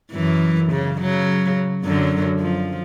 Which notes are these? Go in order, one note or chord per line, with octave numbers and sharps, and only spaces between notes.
F#2 E3
C#3
C#3 F#3
F#2 D3 F#3
F3